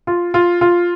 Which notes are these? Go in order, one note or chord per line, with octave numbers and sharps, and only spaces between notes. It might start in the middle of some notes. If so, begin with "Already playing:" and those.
F4
F4
F4